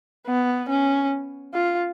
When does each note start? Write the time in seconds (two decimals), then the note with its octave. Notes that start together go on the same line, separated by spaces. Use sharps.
0.27 B3
0.69 C#4
1.54 F4